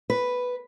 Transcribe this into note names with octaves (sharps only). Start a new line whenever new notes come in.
B4